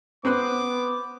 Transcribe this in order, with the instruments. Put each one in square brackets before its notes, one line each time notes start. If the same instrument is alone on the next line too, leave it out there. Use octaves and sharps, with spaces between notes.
[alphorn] B3 [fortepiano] C4 B4 F#6 [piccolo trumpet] D6